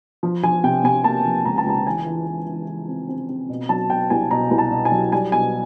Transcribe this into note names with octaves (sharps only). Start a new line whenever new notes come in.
F3
F3 G#5
C3 G5
C3 G#5
A#3 A5
F3
C#2 A#5
A5
C#2 A#5
E3 G#5
E3
E3
E3
E3
C4
C4
C4
B2
F#3 A5
B2 G5
C2 G#5
B2 A#5
C2
A5
B2
G#5
F#3
G3 G#5
B2 G#5